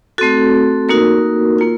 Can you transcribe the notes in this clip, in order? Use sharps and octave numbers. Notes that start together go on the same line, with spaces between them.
A3 C4 F#4 A4
A#3 D#4 F#4 A#4
A#3 F4